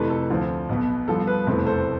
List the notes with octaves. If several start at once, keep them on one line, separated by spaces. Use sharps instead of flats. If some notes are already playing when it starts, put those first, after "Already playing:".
Already playing: F2 C3 E3 A3 B4
A4
D2 D3 F3 C4
B1 B2 B3
G2 F3 B3 A4
B4
F1 E2 B2 A3 C4 B4
A4 C5